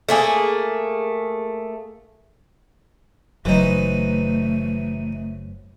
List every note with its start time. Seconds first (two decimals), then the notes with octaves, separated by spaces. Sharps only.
0.08 A3 A#3 G#4
3.45 F#1 E3 F#3 A3 D#4 B4 C5